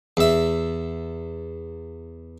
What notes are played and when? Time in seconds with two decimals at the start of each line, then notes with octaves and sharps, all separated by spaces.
0.17 E2 E5